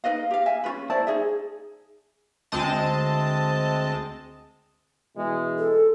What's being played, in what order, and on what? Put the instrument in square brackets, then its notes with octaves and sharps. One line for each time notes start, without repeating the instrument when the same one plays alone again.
[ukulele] D#4 B4 D#5 F5
G4 F5
E5 G#5
C#4 F4 B4
E4 C5 D5 A5
D#4 G#4 E5
[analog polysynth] D2 G#3 C4 D#5 A5
[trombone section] B2 E3 G#3
[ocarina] A4